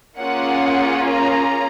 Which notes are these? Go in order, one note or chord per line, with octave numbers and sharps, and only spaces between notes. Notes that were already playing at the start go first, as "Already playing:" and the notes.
A#3 C#4 F4 G#4 F#5
A#5